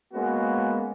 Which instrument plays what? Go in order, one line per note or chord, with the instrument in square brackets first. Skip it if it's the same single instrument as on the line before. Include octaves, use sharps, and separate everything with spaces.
[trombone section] G#3 A#3 B3 C#4 F#4